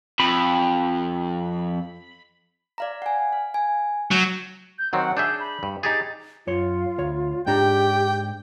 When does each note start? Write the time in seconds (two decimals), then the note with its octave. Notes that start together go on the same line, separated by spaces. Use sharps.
0.20 F2 B5
2.78 D5 F5 A#5
3.02 F#5 G#5
3.33 F5
3.54 G#5
4.11 F#3 G6
4.79 G6
4.93 D#3 F#3 C4 F#5
5.17 D4 G#4 E5 G6
5.40 B5
5.63 G2
5.83 D#4 G4 G#4 A6
6.47 F#2 F4 C#5 C6
6.98 D2 C#5
7.47 G#2 D4 G4 G5 A#5